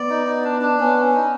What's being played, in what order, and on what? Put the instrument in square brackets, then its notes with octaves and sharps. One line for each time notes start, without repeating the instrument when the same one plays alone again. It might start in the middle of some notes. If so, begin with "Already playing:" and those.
Already playing: [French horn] B3 [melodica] D5
[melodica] D#4
D#4
D4
D4
[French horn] B3 [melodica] C#4
[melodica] C#4
D#4